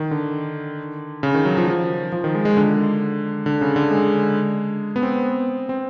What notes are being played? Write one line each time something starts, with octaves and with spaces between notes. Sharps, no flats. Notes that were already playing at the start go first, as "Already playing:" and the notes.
Already playing: D#3
D3
C#3
D#3
F#3
F3
F3
F3
D#3
G#3
G#3
D3
D3
C#3
D3
G#3
B3
C4
C4